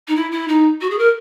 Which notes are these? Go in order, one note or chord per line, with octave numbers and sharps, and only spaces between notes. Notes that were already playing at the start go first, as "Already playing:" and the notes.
D#4
E4
E4
D#4
F#4
G#4
A#4